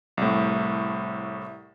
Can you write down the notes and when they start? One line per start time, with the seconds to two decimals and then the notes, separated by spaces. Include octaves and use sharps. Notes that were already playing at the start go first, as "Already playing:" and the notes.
0.17 C2 A2